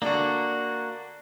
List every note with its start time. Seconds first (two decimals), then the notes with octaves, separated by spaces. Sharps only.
0.02 D3 A#3 D4 F#4